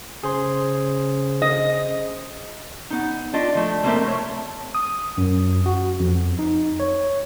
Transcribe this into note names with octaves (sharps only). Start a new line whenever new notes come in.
C#3 G#4 C5 C6
D#5
B3 D#4
D4 F4 D#5
F3 A3
A3 A#3 C4 F#4 A#4 E5
A3 C#5
D#6
F#2
F#4
F2
D#4
C#5